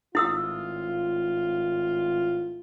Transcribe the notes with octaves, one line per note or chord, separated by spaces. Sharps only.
G#1 A2 E4 F4 D#6 E6